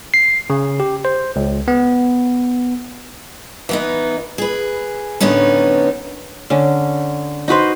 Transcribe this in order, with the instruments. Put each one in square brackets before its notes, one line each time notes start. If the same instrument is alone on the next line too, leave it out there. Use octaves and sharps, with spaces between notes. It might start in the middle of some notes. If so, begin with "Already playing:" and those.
[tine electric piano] C7
C#3
G4
C5
C#2
B3
[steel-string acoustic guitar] E3 B3 D#4
G#4 B4
F#2 A2 D3 B3 C#4 D#4
[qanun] D3 C#4
D#4 F#4 B4 C5